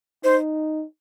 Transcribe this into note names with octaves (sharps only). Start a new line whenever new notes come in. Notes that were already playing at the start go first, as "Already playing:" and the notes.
D#4 C5